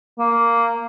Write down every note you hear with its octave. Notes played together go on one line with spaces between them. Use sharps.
A#3